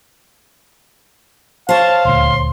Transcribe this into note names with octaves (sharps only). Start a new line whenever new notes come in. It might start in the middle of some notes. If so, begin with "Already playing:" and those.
C5 C#5 F5 A5
D#1 D2 C6